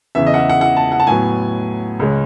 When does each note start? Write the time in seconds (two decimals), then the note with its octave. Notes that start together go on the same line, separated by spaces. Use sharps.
0.15 E2 C#3 E3 E5
0.27 D#5
0.34 F#5
0.38 E5
0.49 F#5
0.61 F#5
0.77 A5
0.92 F#5
1.00 A5
1.07 A2 F#3 B3 G#5
1.99 C#2 C#3 G#3 C#4